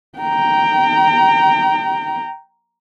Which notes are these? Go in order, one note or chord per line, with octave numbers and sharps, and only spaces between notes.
G5 A#5